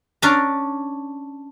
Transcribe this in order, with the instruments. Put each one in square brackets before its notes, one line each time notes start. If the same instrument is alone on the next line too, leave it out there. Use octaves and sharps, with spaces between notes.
[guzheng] C#4 D4 D#5 A#5